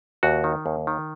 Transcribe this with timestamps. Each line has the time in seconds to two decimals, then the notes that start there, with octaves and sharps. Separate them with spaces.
0.23 D#2 F#4
0.44 D#3
0.66 D#2
0.87 D#3